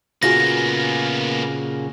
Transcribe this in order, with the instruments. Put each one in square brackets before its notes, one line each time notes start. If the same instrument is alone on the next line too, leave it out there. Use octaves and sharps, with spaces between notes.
[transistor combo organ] A#2 C#3 [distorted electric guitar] A#3 B3 [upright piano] F4 F#4 G#4 [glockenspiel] A#6